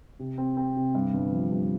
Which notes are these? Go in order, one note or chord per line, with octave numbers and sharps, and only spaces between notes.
C3
C4
C4
C3
G2
G1
F3
G2